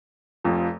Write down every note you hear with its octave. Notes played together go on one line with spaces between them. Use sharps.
F1 F2 F3